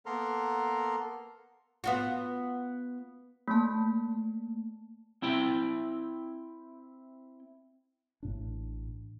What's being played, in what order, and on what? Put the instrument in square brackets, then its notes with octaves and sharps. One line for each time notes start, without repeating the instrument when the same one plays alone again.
[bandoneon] A#3 B3 A4 A#4 A#5 C6
[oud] B3 F4 F#4
[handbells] A3 A#3 A5
[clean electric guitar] C4 E4 G5
[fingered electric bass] A1 A2 D4